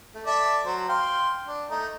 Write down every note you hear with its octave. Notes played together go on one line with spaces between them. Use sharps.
A3
A4 D5 E5
F#3 C5
F5 G5 C6
D4
A3 D#4